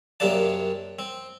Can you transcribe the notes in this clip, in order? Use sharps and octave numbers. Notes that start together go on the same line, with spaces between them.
F#2 C3 A#3 D4 A5
C4